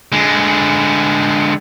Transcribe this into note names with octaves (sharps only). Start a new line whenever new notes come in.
D3 G#3